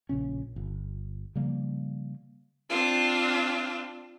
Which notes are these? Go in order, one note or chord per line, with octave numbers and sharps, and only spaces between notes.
A#1 A#2 C#3 C#4
G1
C#3 F3 G3 A#3
C4 D4 F4